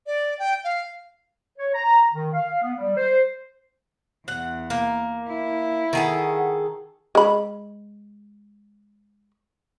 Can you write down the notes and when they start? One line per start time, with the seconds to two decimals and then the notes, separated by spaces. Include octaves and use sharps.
0.07 D5
0.39 G5
0.64 F5
1.58 C#5
1.74 A#5
2.13 D#3
2.33 F5
2.62 B3
2.78 G3
2.97 C5
4.28 E2 F#5
4.70 A#3
5.28 E4
5.93 D#3 G#4 A4 F#5
7.15 G#3 B5